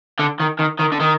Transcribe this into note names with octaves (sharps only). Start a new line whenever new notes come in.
D3
D#3
D#3
D#3
D3
D#3